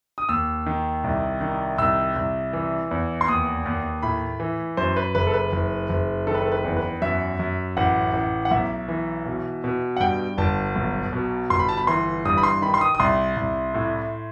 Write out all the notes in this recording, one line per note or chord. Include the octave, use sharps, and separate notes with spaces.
D#6
D#2 E6
D#3
C2
D#3
C2 E6
C2
E3
E2
C6
D#2 D#6
D#2
A2 B5
E3
F#2 C5
B4
F#1 B4
A4
B4
F#1
F#1
D#3 A4
B4
A4
B4
E2
B4
F#2 E5
F#2
A1 F#5
A1
F#5
B1 E5
E3
B2
B2
F#5
G2 G5
G1 A5
B1
B2
G1 C6
B5
A5
B5
E3 C6
G2 D#6
B5
C6
D#3 B5
C6
D#6
D#6
C2 C6
C2
A2